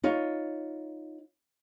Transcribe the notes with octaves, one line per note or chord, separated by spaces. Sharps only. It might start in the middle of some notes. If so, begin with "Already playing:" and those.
D#4 F4 C#5